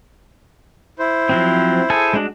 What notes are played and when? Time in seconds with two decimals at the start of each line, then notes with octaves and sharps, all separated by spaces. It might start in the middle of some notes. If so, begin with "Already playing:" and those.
0.99 E4 C5
1.29 F3 F#3 C4
1.90 G#4 A4 G#5
2.14 G#3 D4 F#4